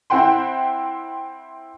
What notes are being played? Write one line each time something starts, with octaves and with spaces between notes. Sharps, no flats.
C4 E4 C5 F#5 G5 C6